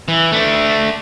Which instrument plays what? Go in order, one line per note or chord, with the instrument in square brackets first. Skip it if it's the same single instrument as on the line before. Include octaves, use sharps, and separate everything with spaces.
[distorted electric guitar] E3
A3 D4